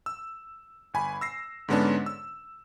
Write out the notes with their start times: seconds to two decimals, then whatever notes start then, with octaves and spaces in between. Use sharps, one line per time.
0.06 E6
0.94 G1 G#5 B5
1.21 E6 A#6 C7
1.68 G#2 D3 G#3 B3 C#4 D4
2.06 E6